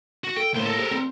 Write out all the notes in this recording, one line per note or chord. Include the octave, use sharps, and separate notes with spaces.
F#4
A4 G5
C#2 A2 A#3 C5
A4 A#4
G4 G#4 C5
E2 C4